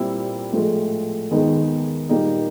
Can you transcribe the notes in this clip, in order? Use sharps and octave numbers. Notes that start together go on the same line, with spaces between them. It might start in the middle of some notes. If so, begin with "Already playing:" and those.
Already playing: A#2 G3 C4 E4
A2 F3 G#3
D#2 D#3 G#3 B3 D#4
A#2 G3 A#3 D#4